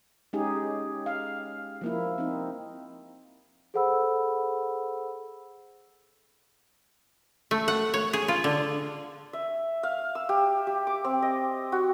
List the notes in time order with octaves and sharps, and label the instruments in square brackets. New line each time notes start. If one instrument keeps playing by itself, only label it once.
[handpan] G#3 C#4 D#4 G4 G#4
F5
F3 A#3 E4
C4 D#4
[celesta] G#4 A4 C5 F#5 B5 E6
[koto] A3
F#5
C#5
G#4
F4
D3
[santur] E5
F5
E6
G4
G4
D6
C4
D#5
F#4